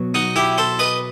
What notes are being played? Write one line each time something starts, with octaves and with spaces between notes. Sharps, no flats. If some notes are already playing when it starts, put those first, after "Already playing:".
Already playing: B2 F#3 B3
D#4 F#4
E4 G4
A4 C5
B4 D#5